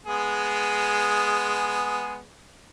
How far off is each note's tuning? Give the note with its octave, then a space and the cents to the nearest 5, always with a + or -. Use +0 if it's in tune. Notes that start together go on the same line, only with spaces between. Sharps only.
G#3 +0 B3 +0 G#4 +0